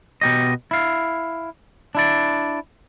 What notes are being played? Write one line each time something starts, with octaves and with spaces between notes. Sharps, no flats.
B2 G4 D#5
E4 F5
D4 E4 D5